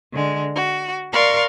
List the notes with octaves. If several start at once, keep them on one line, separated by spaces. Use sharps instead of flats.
D3 G#3
F#4
A#4 D5 F5 C6 C#6